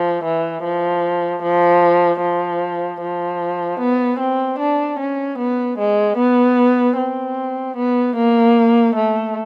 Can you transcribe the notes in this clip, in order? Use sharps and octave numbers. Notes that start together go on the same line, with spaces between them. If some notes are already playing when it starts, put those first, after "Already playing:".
Already playing: F3
E3
F3
F3
F3
F3
B3
C4
D4
C#4
B3
G#3
B3
C4
B3
A#3
A3